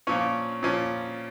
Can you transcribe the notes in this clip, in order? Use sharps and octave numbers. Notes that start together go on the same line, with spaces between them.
A#2 F3 C#4 C#5
A#2 F3 C#4